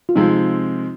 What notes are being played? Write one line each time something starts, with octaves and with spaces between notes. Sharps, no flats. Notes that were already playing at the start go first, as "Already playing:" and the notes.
F4
C3 F3 G#3 C4 D#4